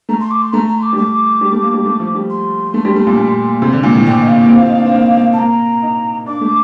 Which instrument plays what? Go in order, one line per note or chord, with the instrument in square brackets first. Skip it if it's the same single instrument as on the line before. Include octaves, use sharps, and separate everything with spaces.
[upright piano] A3 [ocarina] A#5
[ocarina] C6
D6
C6
[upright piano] A3 [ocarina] A#5
[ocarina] A#5
C6
D6
[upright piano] G3
[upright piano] A3 [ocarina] D6
[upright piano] G3
A3
A#3
G3
A3
F3
G3
[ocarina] C6
[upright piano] A3
G3
A3
A#2
A#2
C3
D3
A#2
A2
[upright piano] D3 [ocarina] G5
[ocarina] D#5
F5
[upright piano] A#3
C4
F4
D#4
D4
C4
A#3
A#3
[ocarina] A5
[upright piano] A#3 [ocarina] A#5
[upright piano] D#4
[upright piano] D4 [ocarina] D6
[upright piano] A3